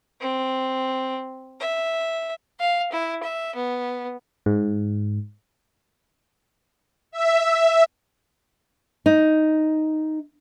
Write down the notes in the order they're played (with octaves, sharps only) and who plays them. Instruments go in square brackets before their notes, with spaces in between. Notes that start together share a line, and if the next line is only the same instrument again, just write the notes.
[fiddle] C4
E5
[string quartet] F5
E4
E5
B3
[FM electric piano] G#2
[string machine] E5
[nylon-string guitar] D#4